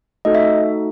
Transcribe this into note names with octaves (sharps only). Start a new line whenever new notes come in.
A3 D#4 F#4 A4 D#5
E5